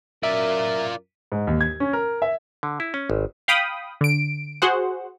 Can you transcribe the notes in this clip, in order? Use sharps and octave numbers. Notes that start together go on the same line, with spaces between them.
F#2 F4 A#4 D5 E5
G#2
D#2
G#6
C#4
A#4
E5
D3
E4
C#4
G#1
F5 G5 B5 D#6
D3 D7
F#4 G#4 C5 F#5